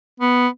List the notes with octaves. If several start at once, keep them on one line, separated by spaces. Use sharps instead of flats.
B3